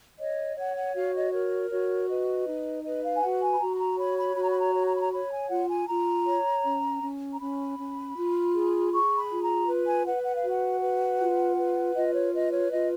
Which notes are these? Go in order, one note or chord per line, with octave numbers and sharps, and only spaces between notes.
C#5 D#5
C#5 F#5
F#5
F#4 F5
D#5
A#4 C#5
F#4 C#5
B4 D#5
D#4
B4 D#5
F5
G#5
F#4 F#5
G#5
B5
F#4 A#5
B5
A#5
C#5 B5
B5
F#4 B5
A#5
B5
A#5
C#5
A#5
B5
A#5
C#5 B5
G#5
F4 F#5
G#5
F4 A#5
C#5
C#4
C#4
A#5
C#4 B5
C#4
F4
G#4
G#4 C#6
B5
F4
A#5
B4
G#5
B4 F#5
F#5
F5
F#4
F#5
B4
F4
B4
F4 D#5
C#5
B4 D#5
C#5
F4 D#5